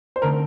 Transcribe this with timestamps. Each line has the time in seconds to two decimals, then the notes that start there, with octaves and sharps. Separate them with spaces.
0.16 C5
0.22 D3 A3 C4 D#4 A#4